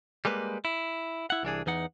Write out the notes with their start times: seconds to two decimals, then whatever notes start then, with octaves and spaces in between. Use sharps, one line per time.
0.25 G3 G#3 A#3 B4
0.65 E4
1.30 E4 F#5
1.43 C2 E3 D4 G#4
1.66 E2 E3 D#4 F#5